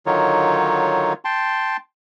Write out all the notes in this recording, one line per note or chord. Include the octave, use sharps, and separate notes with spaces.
D3 D#3 F#3 D#4 F4 C#5
G5 A5 C6